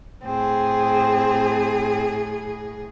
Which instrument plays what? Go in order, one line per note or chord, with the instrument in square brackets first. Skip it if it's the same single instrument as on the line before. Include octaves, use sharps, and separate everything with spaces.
[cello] A2 G#4 [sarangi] C4